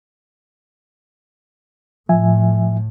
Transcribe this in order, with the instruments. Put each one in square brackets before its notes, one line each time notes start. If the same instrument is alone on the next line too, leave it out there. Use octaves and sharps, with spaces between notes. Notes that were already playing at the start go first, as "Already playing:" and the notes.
[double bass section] A2 [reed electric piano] F3 E5 G#5